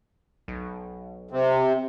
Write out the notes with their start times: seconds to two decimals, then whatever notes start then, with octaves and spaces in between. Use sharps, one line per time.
0.48 B1
1.31 C3